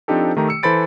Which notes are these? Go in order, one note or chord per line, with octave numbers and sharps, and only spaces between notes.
F3 C4 D4 D#4 G4 A4
D#3 A3 G4 A#5
E6 C#7
E3 A4 C5 B5 A6 D7